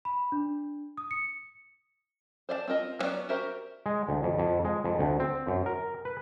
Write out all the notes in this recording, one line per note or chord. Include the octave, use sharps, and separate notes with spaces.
B5
D4
D#6
C#7
C5 D5 E5 A5
C4 F4 A#4 D#5
E3 F#3 B3 C#4 D5
F#4 G4 A#4 C5 E5
G#3
D2
F2
F2
G#3
F2
D2
C4
F#2
A#4
B4